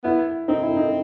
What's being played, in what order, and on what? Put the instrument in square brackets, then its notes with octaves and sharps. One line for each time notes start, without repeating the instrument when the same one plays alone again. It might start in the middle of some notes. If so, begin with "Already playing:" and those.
[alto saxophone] B3 [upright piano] E4
[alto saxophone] C4 [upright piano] D#4
[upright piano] E4
D#4